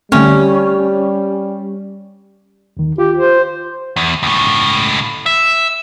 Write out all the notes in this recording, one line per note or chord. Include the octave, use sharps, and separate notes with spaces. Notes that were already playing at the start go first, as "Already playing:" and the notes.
D3 G3 A3 C4 C#4
D#2 D#3
F4 G4
C5
E2
C#2 A2
E5